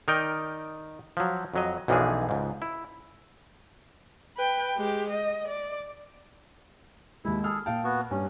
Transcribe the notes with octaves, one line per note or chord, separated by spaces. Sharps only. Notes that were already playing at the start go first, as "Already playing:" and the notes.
D#3 D#4 A#4 D5 D#5 G5
F3 F#3
F2 F#3 D#5
B1 F#2 E3 F3 D4 G#4
C#2 G#2
E4
B4 G5
G#3 G4
D#5
D5
D#2 G#3 E4
G#4 A4 F6
A#2 F5 G5 A5
B3 F#4
G2 C#4